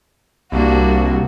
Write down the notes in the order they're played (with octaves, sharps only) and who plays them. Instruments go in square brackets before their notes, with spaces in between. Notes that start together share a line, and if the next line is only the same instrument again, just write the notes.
[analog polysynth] C2 [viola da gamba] A#3 D4 F#4